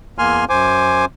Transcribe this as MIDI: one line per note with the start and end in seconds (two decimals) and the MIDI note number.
0.19 0.45 40
0.19 0.45 58
0.19 0.45 80
0.19 0.45 84
0.19 0.45 89
0.49 1.05 42
0.49 1.05 72
0.49 1.05 80
0.49 1.05 86